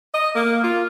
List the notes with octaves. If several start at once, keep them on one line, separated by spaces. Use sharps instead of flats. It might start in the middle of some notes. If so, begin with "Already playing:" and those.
D#5
A#3
F4